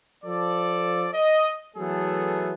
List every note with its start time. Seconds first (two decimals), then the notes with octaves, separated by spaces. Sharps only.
0.24 F3 A4 D5
1.14 D#5
1.77 E3 F#3 A3 B3 G#4 A4